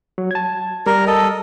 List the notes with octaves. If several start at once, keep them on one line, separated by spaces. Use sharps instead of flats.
F#3
A5 G#6
G3 A#4
A4 D#5